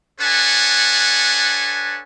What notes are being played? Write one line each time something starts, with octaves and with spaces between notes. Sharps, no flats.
D4 A4 B4 C#5 F#5 G#5